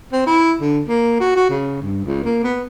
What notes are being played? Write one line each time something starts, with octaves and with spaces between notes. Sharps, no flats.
C4
E4
D3
A#3
F#4
F#4
C#3
G2
C#2
A#3
B3